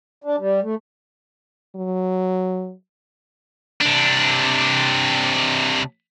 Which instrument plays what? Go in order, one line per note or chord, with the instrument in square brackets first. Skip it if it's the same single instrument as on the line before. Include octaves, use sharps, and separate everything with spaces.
[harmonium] D4
G3
A3
[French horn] F#3
[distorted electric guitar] C3 D4